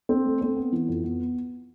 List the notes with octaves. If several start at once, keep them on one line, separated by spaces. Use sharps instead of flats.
C4
A3
C4
B3
E3
F2
B3